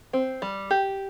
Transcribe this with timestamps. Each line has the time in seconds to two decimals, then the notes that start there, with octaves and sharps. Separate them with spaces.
0.13 C4
0.42 G3
0.71 G4